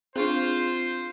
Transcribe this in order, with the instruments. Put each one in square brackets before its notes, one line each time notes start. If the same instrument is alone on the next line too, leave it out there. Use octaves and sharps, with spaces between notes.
[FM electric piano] C4 [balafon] D4 G#4 [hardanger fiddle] F4 [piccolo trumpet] C5